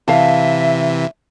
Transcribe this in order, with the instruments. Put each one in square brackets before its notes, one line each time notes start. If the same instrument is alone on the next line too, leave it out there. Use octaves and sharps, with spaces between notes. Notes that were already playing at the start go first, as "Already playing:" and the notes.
[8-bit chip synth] C3 E3 [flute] E5 [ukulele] F5 A5